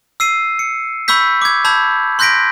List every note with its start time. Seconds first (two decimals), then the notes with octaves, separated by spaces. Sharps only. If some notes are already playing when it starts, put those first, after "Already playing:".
0.20 E6 C7 D#7
0.59 C#7
1.08 B5 C#6 E6 G6 B6
1.42 D6 G#6
1.64 A5 B5 E6 G6 G#6
2.19 C6 F#6 G6 A#6 B6 D7